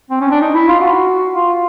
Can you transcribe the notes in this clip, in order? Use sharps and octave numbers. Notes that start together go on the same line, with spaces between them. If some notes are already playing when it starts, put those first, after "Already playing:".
C4
C#4
D4
D#4
E4
F4
F#4
F4